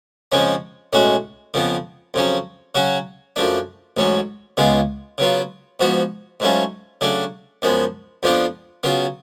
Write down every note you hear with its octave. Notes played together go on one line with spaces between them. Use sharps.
F2 C#3 F3 G#3 C#4
B1 A2 G#3 C#4 F#4
F2 C#3 F3 B3
F2 C#3 F#3 C#4
C#3 F#3 C#4 F#4
F#2 F3 A3 D4
A1 G#2 F#3 C#4
C#2 C#3 G#3 B3 F4
C#3 F#3 B3 F4
G#2 F3 B3 F#4
G#2 F#3 A3 C#4 F4
C#3 F#3 A3 D4
F#2 F3 G#3 B3
F2 F3 B3 D4 F4
C#3 F#3 B3 F4